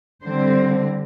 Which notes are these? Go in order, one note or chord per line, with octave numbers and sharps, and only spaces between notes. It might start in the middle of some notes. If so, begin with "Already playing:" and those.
D3 G3 C4 C5